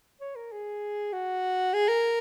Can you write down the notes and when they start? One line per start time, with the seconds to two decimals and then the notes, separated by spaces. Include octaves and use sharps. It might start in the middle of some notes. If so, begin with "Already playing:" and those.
0.20 C#5
0.36 A#4
0.52 G#4
1.13 F#4
1.74 G#4
1.89 A#4